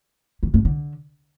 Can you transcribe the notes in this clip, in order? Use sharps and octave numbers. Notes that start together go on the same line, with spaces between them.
E3
G2
D3